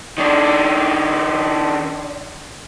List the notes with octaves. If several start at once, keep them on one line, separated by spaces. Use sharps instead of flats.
D#3 D4